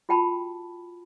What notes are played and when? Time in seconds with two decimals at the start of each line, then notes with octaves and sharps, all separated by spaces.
0.09 F4 F#4 G5 A5 B5